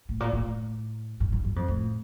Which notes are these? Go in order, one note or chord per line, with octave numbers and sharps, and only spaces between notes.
A2
A#2
A2
G2
G2
G2
F2
A2